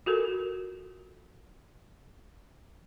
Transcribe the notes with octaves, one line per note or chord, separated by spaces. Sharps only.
F4 F#4 A4 A#4